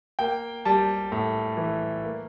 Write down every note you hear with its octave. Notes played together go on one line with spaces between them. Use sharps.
A#3 G5
G3 A5
A2
E3
A#3